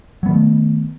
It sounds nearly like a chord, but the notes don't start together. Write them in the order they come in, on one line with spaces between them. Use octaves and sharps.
F#3 B3 D#3 A3